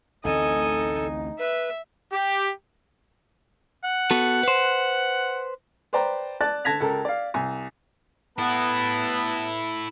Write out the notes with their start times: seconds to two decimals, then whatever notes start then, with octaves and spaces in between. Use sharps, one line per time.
0.25 A1 D2 C4 D#4 A4 D#5 G#5
1.39 B4 E5
2.11 G4
3.84 F#5
4.11 B3 F#4 A4
4.43 B4 C5
5.93 B4 C5 D5 G5 A#5
6.41 D5 A5 F#6 A6
6.65 D3 A5 G#6 A#6 B6 F7
6.80 C#2 A4 A#4
7.05 D5 F5
7.34 C2 G#5
8.38 B3 E4 A4 B4 A5